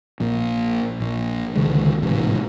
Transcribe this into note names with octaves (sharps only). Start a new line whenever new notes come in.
A#1 A#2
A#1
C#2 D3 D#3 G#3
A1 G#2 C3